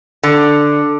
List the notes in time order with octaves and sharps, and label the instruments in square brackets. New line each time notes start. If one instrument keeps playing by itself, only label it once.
[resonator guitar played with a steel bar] D3